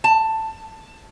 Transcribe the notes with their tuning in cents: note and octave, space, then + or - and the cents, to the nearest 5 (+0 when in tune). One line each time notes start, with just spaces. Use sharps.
A5 +10